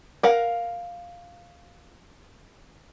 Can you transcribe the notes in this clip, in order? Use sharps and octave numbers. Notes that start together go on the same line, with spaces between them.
A#4 F5 F#5